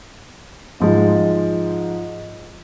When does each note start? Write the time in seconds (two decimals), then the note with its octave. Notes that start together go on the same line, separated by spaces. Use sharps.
0.80 G#2 F3 G#3